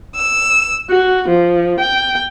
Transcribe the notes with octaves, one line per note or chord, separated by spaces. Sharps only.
E6
F#4
F3
G5